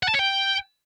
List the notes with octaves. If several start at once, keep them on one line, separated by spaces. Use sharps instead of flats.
F#5
A5
C#5
G5